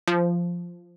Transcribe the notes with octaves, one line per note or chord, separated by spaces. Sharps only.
F3